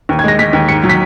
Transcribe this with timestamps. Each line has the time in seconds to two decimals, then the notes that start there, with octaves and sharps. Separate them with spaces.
0.09 D#2
0.19 G#6
0.24 G#3 A#6
0.39 G#3 B6
0.53 D#2
0.68 G#2 C#7
0.84 F#3
0.90 B6